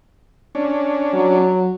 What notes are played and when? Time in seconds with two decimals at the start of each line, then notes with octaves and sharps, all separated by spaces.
0.55 C#4 D4
1.14 F#3